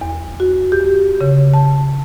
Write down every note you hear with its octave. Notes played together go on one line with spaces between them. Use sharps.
E2
F#4
G4
C#3
A5